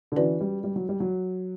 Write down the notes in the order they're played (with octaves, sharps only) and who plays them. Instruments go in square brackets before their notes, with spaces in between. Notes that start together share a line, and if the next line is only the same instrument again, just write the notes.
[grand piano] D3
[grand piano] E3 [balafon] C#4 F#4 B4 D5
[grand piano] G3
G3
F#3
G3
F#3